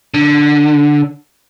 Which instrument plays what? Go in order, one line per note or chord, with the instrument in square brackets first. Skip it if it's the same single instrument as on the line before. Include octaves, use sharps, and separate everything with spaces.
[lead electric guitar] D3